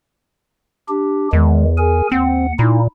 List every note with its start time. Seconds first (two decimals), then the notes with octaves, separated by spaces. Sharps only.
0.89 D4 G4
1.33 E2 D#3 G#3
1.78 G#4 A#4 G#5
2.12 D#2 C4 F#5
2.59 A#2 D#4 E4